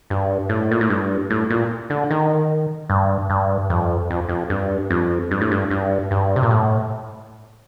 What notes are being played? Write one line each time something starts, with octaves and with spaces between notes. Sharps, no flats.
G2
A2
A#2
A2
G2
A2
A#2
D3
D#3
G2
G2
F2
F2
F2
G2
F2
G2
A2
G2
G2
G2
C3
A#2
A2